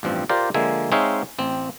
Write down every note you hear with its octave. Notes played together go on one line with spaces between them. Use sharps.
A1 G2 F3 C4
F4 G4 A#4 C5 D5
D3 F3 G#3 A#3 E5 G#5
G#3 C4 D#4 C#5 E5 F5
A1 C4